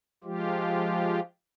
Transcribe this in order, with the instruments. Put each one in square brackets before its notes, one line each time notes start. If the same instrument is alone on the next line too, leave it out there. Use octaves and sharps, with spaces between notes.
[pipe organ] F3 G#3 F4 G4